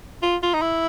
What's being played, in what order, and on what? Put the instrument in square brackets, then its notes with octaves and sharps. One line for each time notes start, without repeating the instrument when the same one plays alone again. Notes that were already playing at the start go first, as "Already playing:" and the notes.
[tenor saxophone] F4
F4
D#4
E4